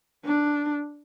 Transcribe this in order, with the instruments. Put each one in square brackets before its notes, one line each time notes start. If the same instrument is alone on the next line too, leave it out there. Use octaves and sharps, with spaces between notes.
[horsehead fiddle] D4